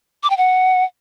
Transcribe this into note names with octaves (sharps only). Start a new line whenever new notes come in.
D6
G5
F#5